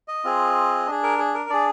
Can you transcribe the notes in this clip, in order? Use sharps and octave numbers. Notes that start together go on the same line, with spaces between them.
D#5
C4 F4 G#4
D4 G#4
A#4
G#4
A#4
D4 G#4 D5